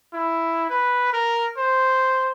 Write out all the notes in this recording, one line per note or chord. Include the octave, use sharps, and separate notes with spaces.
E4
B4
A#4
C5